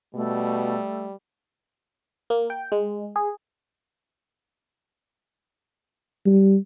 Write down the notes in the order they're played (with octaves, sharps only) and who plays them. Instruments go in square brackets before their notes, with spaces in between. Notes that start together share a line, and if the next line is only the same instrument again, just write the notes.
[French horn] B2 [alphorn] G3 [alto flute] A3
[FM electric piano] A#3
G5
G#3
G#4
[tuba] G3